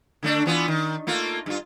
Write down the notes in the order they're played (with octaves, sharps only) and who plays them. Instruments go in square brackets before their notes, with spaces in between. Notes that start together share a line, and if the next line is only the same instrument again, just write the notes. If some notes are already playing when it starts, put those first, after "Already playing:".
[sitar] D3 A3 D4
E3 B3 F4
D#3
A3 A#3 F4
G2 F4